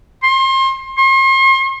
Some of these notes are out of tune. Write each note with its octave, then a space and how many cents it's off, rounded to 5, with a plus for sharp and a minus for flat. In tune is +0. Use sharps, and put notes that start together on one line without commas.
C6 +30
C6 +45